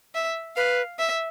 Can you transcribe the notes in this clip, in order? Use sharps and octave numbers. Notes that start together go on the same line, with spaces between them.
E5
B4 F5
E5